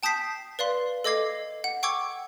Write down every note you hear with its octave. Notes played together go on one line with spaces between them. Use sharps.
G5 A5 D#6 G6 B6 C7
B4 D5 F5 C6
A4 D#5 D6 G#6 C7
F#5
F#5 G5 C#6 D6 E6 G#6